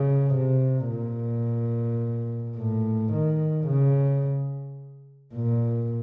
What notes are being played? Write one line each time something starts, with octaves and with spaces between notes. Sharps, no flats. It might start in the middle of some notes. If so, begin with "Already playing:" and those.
Already playing: C#3
C3
A#2
A2
D#3
C#3
A#2